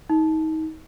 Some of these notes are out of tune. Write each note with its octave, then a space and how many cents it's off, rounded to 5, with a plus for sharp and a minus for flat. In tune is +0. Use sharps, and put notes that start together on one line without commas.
D#4 +30